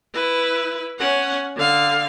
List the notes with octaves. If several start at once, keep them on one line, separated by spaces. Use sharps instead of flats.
E4 B4
C#4 F#5
D3 F5